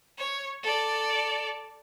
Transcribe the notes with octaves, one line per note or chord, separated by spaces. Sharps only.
C#5
A4 D5